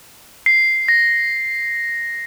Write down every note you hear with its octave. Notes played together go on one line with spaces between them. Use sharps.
C7
A#6